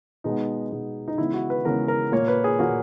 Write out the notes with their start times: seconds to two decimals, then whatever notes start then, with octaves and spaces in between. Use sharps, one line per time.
0.24 B2 G#3 B3 D#4
0.71 B2 G#3 B3
1.08 D#4
1.18 C#3 E3 G#3 B3 E4
1.34 F#4
1.50 B4
1.65 C#3 E3 G#3 B3 A#4
1.88 A#4
2.12 A#2 A#3 C#5
2.28 B4
2.44 G#4
2.59 A#2 A#3 F#4